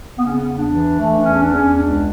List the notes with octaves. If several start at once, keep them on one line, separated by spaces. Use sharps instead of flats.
C#3 B3
C#4
B3
E2
D4
E3
E3 A3
D4
E2 C#4
D4
E2 C#4
C#2 D4